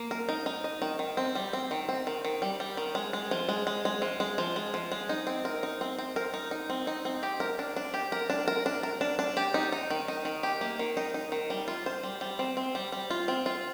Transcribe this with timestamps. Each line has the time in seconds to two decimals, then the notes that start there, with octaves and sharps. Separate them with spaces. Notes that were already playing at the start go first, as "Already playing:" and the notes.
Already playing: A#3
0.11 A#4
0.29 D#4
0.46 D#4
0.64 D#5
0.82 D#3
0.99 D#3
1.17 C4
1.35 G3
1.53 C4
1.71 D#3
1.89 C4
2.07 D#3
2.25 D#3
2.42 G3
2.60 G3
2.77 D#3
2.95 G#3
3.13 G#3
3.31 F3
3.49 G#3
3.67 G#3
3.85 G#3
4.02 F3
4.20 G#3
4.38 F3
4.56 G#3
4.74 F3
4.92 G#3
5.09 D#4
5.27 C4
5.45 A#4
5.63 D#4
5.81 C4
5.98 C4
6.16 A#4
6.34 D#4
6.51 D#4
6.70 C4
6.87 D#4
7.05 C4
7.23 G4
7.40 A#4
7.59 D4
7.76 D4
7.94 G4
8.12 A#4
8.30 D4
8.48 A#4
8.66 D4
8.83 A#4
9.01 D4
9.19 D4
9.37 G4
9.54 D#4
9.72 D#4
9.90 D#3
10.08 D#4
10.25 D#3
10.43 G4
10.61 A#3
10.79 D#3
10.97 D#4
11.14 D#4
11.32 D#3
11.50 G3
11.68 F4
11.86 C5
12.03 G3
12.21 G3
12.39 C4
12.57 C4
12.75 G3
12.92 G3
13.10 F4
13.28 C4
13.46 F4